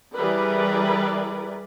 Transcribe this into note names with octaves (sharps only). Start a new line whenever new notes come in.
E3 G3 G#4 A#4 B4 D5